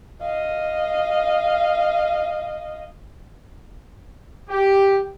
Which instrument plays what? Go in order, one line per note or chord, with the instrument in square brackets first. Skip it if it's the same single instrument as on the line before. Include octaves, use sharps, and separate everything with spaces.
[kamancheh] D#5 F5
[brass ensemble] G4